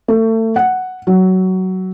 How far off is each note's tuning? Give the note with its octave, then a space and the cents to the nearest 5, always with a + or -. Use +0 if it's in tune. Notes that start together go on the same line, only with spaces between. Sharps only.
A3 +30
F#5 +0
F#3 +15